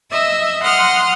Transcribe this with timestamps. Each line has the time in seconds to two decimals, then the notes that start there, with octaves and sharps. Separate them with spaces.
0.11 D#5 E5 E6
0.61 F#5 C6 D#6 F6